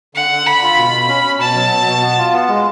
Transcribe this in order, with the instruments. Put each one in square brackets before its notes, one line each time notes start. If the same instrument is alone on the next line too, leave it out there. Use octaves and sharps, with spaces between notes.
[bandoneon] D3 [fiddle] F#5
[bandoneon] D3
[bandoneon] D3 [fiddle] B5
[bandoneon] F4
B2
B2
C#4
C#4
[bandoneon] B2 [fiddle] A5
[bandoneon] F#3
B2
B2
B3
F4
B3
G#3